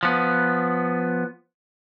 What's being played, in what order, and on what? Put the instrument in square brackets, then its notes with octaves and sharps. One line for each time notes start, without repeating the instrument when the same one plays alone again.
[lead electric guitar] F3 B3